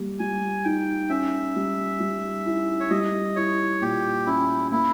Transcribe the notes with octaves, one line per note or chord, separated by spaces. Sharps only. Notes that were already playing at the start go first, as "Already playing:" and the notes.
Already playing: G3 A#3
G3 G#5
D#4 G5
C#4 E5
G3
G3
E4
C#5
G3 D#5
E4 C#5
A#2 G4
C#4 E4
A#3 E4